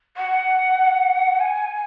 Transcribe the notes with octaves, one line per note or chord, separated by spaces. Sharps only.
F#5
G#5